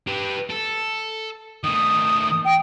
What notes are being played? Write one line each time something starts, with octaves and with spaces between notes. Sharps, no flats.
G4 B4
A4
D#3 A3 D#6
G5